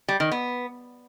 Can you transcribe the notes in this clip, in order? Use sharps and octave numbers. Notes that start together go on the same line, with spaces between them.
G3
D#3
B3